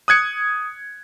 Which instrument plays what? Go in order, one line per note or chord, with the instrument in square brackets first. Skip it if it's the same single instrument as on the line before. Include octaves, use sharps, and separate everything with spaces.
[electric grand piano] D#6 F#6 G#6 C#7